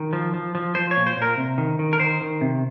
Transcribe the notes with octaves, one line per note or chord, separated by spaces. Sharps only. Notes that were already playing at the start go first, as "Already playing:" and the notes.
Already playing: D#3
F3
F3
F3
F3 C5
C#5
A#2
C5
A#2
A#4
C3
D#3
D#3
A#4
D#3 C5
D#3
C3